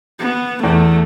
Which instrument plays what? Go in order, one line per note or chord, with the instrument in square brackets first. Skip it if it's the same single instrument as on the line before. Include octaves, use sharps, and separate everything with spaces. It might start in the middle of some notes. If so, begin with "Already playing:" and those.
[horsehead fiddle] B3
[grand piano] E2 [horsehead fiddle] A3